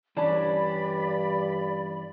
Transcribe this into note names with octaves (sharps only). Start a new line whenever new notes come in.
G2 E3 C#4 D4 D5 A5 B5